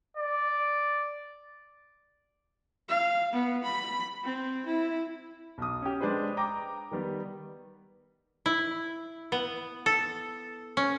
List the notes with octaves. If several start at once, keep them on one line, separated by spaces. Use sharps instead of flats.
D5
F5
B3
B5
C4
E4
B1 D#6
C#4 G4
G#3 D4 G#4 B4 C5
G5 A#5 D6 A#6
D#3 G3 B3
E4
B3
A4
C#4